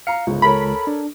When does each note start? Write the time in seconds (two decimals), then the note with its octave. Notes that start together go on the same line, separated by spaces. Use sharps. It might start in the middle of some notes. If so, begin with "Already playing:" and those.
0.07 F5 A#5 C#7
0.27 G1 C#2 G#2
0.42 A4 A#4 C#5 B5
0.87 D4